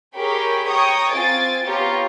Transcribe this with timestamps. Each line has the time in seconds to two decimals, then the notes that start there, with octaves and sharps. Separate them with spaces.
0.15 G4 G#4 A#4 C#5 G5 B5
0.68 C#5 G5 A#5 C#6 D#6 G#6
1.11 C4 F4 G#5 A6 D7
1.63 B3 F4 G4 C#5 A#5